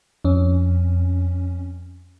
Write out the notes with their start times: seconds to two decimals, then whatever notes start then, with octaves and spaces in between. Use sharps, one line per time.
0.25 F2 C#4